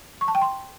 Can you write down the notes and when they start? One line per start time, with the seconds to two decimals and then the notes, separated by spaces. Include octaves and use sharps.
0.21 C#6
0.28 A5
0.35 G5
0.42 C6